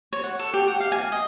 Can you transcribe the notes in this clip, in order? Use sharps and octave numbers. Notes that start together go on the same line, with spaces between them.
C#5
F#5
A4
G4
F#5
F5
G#5
D#5